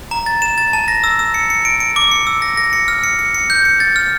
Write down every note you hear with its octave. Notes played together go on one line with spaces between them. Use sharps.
A#5
A6
E7
A6
A5
A#6
E6
E6
C#7
C#7
D7
D7
D6
C#7
E6
A#6
A#6
C#7
F6
C#7
C#7
C#7
G6
C#7
A6
F6